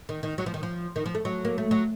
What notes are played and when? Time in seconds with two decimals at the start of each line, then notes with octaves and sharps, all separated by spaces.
0.09 D#3
0.23 D#3
0.38 F#3
0.46 F3
0.54 D#3
0.63 F3
0.96 D#3
1.06 F3
1.15 A3
1.25 F#3
1.45 A#3
1.58 A3
1.71 F#3